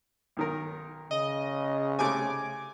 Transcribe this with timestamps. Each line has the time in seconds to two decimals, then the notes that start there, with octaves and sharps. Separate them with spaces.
0.37 B1 D#3 A#4
1.11 C#3 D#5
1.99 C3 A3 G#5 D6